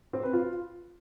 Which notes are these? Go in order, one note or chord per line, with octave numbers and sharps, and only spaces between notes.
C4
B4
F4